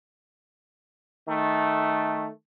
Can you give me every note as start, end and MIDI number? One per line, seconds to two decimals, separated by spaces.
1.29 2.28 51
1.29 2.28 57